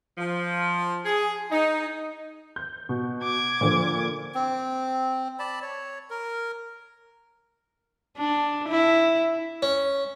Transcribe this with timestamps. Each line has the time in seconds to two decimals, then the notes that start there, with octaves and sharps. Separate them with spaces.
0.18 F3
1.04 G#4
1.51 D#4
2.56 G6
2.89 B2
3.23 D6 G#6
3.61 A#2 D3 F3
4.35 C4
5.39 D5 A5 B5
5.62 C#5
6.10 A#4
8.18 D4
8.69 E4
9.62 C#4